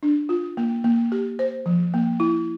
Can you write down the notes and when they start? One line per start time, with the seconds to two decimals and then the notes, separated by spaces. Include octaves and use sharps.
0.03 D4
0.29 F4
0.57 A#3
0.84 A#3
1.12 G4
1.39 C5
1.66 F3
1.94 A#3
2.20 E4